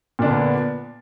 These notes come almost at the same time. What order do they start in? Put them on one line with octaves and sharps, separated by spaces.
A#2 D4 D3 B3